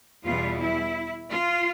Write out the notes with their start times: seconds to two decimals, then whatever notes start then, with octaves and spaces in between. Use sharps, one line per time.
0.25 E2 B2 G3 B3 F4
0.60 E4
1.31 F4